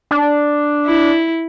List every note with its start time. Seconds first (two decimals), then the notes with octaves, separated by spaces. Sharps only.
0.11 D4
0.86 E4